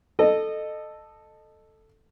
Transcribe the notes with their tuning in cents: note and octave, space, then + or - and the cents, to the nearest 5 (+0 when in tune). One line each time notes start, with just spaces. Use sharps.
A4 +0 D#5 -20